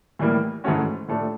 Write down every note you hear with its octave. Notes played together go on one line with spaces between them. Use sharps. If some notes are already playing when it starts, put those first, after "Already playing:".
A2 E3 G3 A#3
G#2 E3 A3 C#4 F#4
A2 F3 A3 D4